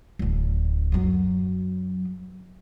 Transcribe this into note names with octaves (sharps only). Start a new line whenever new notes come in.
D1 D3
F#2 F#3